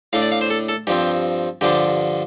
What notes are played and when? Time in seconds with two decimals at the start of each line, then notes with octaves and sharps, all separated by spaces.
0.13 A2 A3 D4 F5
0.22 D5
0.32 F5
0.41 C5
0.50 A4
0.69 A4
0.87 G2 F3 C4 G4
1.61 G2 D3 F3 D4 G4